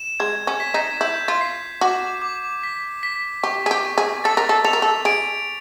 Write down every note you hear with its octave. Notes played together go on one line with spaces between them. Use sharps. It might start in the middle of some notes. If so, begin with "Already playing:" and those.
Already playing: E7
G#3 G#6
C#4
B6
D#4
E4 G6
F4
C7
F#4 D6
D6
B6
B6
G4 C#6
G#4
G4
C#6
G#4
A4 A6
A#4
A4
A4 F7
A#4
A4
G#4 D7